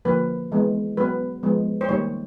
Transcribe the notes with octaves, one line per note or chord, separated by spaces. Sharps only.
D3 F3 A#3 B4
E3 G#3 B3
F#3 B3 B4
F3 G#3 B3
C5
D#3 G3 A#3 C#5